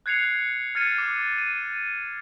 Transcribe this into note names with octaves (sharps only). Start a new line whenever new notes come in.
F#6 G#6 C7 C#7 F7
F6 G#6 A6 C#7 D#7
D6
D#7